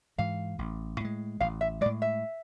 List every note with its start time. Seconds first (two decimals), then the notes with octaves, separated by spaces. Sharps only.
0.18 G#2 E3 G#3 F5
0.59 A1
1.00 A2 G#3
1.40 A1 F5
1.61 E5
1.81 G#3 D5
1.86 A2
2.02 E5